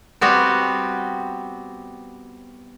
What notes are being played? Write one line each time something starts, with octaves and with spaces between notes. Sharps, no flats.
G3 B3 C4 F#4